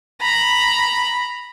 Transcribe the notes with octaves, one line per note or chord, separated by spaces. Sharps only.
A#5 B5